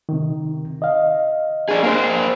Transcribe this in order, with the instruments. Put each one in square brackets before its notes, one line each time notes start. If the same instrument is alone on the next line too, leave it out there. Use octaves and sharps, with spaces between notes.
[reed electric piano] C3 D#3
D#5 F5
[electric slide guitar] D4 G#4
A#3 C5